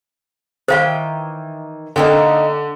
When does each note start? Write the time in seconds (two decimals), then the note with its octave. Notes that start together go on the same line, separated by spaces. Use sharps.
0.68 D#3 E3 C5 F5 G5
1.96 D3 A#3 D#4 G5